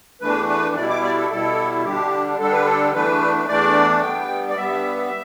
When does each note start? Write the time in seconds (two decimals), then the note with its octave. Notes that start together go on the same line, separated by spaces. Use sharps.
0.21 E2 E3 A3 D4 B4
0.48 B4
0.76 B2 G3 E4 D5
0.89 D6
1.03 D5
1.17 A4
1.30 B2 G3 E4 A4
1.84 D3 G3 D4 G4
2.38 D3 G3 D4 A4
2.52 B4
2.65 A4
2.93 E2 E3 A3 D4 B4
3.48 E2 E3 A3 D4 D5
4.02 G2 G3 B3 G5
4.49 D5
4.56 G2 G3 B3 E5